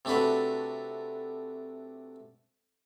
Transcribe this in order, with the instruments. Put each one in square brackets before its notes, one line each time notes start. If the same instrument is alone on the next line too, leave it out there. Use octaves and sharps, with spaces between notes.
[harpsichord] C3 A3 D4 F#4 B4